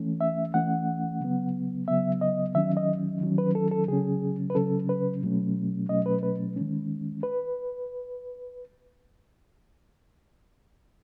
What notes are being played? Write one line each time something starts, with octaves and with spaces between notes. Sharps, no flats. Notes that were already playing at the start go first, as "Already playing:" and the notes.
Already playing: E3 A3 C#4
E5
E3 A3 C#4 F#5
C#3 F#3 B3
C#3 F#3 B3 E5
D#5
D#3 F#3 C#4 E5
D#5
D#3 F#3 C#4
B4
A4
A4
C#3 F#3 C#4 G#4
B4
C#3 F#3 C#4 A4
B4
B2 F#3 A3 C#4
B2 F#3 A3 C#4 D#5
B4
B4
D#3 G#3 C#4
B4